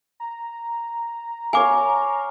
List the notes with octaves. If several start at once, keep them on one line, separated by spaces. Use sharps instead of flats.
A#5
C#5 F5 G#5 D6